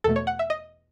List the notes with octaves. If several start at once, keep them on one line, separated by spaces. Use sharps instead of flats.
E2 B2 A3 A4
C#5
F#5
E5
D#5